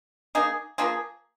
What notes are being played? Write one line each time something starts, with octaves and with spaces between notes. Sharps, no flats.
A#3 D#4 G#4
F3 A#3 F4 G#4